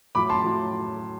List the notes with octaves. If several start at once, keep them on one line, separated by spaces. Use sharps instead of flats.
A2 F#3 B5 D6
A5 C6
A2 F#3